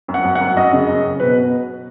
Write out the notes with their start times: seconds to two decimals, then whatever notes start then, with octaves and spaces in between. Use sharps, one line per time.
0.08 F#2
0.14 F#5
0.24 F#2
0.35 F#5
0.40 F#2
0.56 F#2 D#5
0.72 C#3
0.88 F#2
1.04 F#2
1.20 B2 B4